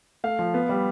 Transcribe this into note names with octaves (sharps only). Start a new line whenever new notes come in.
A3 F5
F3
B3
G3